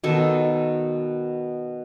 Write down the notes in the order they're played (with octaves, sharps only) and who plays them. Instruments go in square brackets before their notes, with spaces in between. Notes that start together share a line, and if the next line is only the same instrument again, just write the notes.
[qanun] B2 D#3 A4